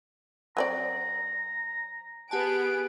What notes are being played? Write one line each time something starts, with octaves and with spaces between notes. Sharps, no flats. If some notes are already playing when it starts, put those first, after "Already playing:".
F#3 C4 D5 A#5
B3 G4 G#4 F#5 G#5 A5 D7